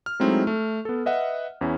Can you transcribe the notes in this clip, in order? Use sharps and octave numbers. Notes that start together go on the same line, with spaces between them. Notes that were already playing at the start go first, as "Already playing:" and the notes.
F6
F#3 G#3 A3 C4 D#4 E4
A3
B3 A4
B4 D#5 E5 F#5
E2 C#4 E4